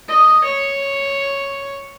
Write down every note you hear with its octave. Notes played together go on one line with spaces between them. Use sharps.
D#5
C#5